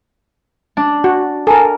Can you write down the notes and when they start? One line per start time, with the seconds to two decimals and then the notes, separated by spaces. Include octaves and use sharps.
0.77 D4
1.04 F#4
1.47 A4 A#4 G#5